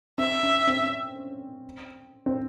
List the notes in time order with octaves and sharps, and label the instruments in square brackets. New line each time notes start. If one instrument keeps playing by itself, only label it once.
[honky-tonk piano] C4 [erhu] E5
[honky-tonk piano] C#4
C4
C4